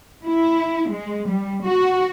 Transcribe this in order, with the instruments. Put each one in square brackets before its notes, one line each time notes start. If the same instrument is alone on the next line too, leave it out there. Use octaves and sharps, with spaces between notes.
[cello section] E4
G#3
G3
F#4